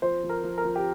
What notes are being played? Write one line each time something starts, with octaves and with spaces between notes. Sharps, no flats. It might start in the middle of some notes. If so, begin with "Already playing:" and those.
F3 C5
F3
A#4
F3
A#4
F3
G4